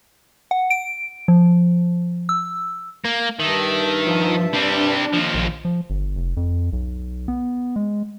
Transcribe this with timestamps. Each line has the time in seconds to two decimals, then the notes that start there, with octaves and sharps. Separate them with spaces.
0.51 F#5
0.70 D7
1.28 F3
2.29 E6
3.05 A#3
3.39 G2 D#3 E5 A5
4.07 F3
4.53 G3 C4 D4
5.13 D#2 F3
5.34 A#1
5.65 F3
5.90 G1
6.16 F1
6.37 F2
6.73 B1
7.28 B3
7.76 G#3